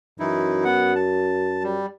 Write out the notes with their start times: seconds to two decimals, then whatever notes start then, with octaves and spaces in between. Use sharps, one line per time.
0.19 F#2 E3 D#4 E4
0.64 B3 F#5
0.95 A5
1.63 G3